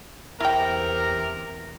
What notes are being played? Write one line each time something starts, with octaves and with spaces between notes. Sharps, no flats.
E2 C3 E4 A#4 G5